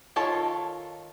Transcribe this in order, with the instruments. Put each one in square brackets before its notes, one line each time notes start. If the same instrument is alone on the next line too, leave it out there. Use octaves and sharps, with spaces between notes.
[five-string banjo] D#3 F4 A4 C#5 A5